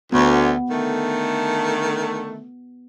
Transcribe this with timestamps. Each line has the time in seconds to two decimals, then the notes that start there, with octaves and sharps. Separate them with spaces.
0.12 D2 B3
0.69 D3 D#3 A3